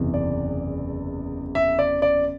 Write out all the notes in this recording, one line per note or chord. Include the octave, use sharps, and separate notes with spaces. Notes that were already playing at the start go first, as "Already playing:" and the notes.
Already playing: F#1 E2 C3 E3
D5
E5
D5
D5